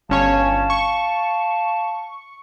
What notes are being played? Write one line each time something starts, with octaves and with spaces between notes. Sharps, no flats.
G1 C#4 C#5 F5 A5
C#6